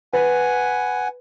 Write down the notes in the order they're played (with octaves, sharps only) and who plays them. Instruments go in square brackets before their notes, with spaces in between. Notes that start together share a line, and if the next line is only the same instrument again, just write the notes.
[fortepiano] B4 [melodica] F#5 G#5